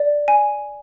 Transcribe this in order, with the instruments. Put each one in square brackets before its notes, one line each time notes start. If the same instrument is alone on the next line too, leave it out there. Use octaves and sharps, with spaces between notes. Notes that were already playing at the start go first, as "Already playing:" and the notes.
Already playing: [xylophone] D5
G#5